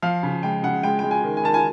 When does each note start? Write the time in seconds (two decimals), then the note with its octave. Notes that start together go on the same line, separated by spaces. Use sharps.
0.02 F3 F5
0.23 C#3
0.43 G#3 G5
0.63 C#3 F#5
0.83 G#3 G5
0.99 G#3 G5
1.11 G#5
1.23 D#3
1.37 G#5
1.44 D#3 A5
1.54 G#5